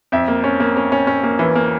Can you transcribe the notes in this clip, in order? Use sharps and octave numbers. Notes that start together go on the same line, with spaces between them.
F2 E5
A#3
C#4
A#3
C#4
C#4
C#4
A#3
E3
A#3